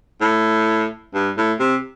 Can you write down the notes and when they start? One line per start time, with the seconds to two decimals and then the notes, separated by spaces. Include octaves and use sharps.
0.21 A2
1.14 G2
1.37 A2
1.60 C3